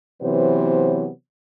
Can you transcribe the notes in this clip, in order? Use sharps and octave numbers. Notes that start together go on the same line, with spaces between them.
C3 E3 F#3 B3 C5 C#5